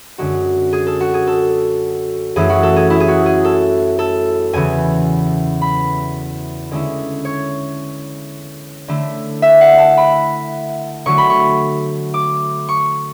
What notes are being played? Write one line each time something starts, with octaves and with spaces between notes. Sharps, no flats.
F#2 D3 G#3 F#4
G#4
A4
F#4
G#4
A4
F#2 E3 A3 E4 G#4
F#4
A4
G#4
E4
G#4
F#4
G#4
A4
A4
E2 C#3 E3 G#5
B5
D3 G#3 C#4 E4
C#5
D3 A3 E4
E5
F#5
A5
B5
D3 F#3 A3 C#6
B5
C#6
D6
C#6